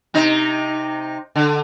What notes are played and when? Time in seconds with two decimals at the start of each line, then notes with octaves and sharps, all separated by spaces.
0.14 C3 D#4
1.36 D3